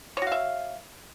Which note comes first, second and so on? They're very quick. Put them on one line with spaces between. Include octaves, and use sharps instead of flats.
C#5 F#4 F5 E5